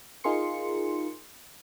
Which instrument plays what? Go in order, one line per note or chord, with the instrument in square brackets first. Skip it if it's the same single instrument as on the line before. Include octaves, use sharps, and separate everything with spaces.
[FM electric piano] D#4 F4 G#4 A#4 C6 C#7